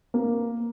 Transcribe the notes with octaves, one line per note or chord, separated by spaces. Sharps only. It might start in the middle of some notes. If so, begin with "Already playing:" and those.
A#3